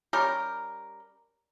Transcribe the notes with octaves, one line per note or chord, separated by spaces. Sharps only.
G3 C#4 G4 A#4